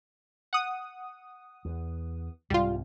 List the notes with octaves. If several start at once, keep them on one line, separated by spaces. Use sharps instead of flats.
F#5 D#6
E2
C2 G#2 G3 F4